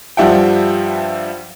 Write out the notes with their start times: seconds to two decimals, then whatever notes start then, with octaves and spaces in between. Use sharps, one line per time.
0.17 G2 F3 G3 E5 F#5 G5